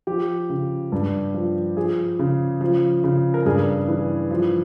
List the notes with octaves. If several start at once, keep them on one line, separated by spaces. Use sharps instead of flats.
F3 G4
C#3
G2
F3
F3 G#4
C#3
F3
C#3
A#4
G2 G#4
E3
F3